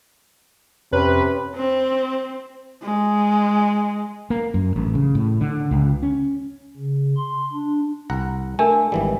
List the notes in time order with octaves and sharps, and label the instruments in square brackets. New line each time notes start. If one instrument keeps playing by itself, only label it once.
[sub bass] F2 [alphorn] C3 [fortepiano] C#4 [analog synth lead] B4
[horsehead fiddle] C4
G#3
[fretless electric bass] A#3
F#2
A1
C#3
A2
D3
C#2
C#4
[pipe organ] C#3
C6
D4
[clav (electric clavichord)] C2 F#5 A#5
[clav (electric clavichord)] A3 [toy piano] D4 A#4 G#5
[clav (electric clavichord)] G#1 E3 G3